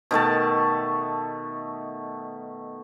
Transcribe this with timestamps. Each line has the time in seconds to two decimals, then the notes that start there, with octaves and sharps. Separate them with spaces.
0.11 B2 D#3 A3 A5